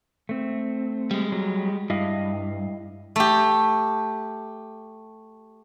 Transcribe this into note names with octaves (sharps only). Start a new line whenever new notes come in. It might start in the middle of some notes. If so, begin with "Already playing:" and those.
A3 C4
G3 G#3
F#3
G2 E4 D#5 F5
A3 G4